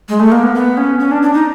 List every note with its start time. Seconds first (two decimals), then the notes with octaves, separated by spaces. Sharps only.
0.09 G#3
0.20 A3
0.32 A#3
0.43 B3
0.55 B3
0.77 C#4
0.99 C#4
1.11 D4
1.22 D4
1.34 D#4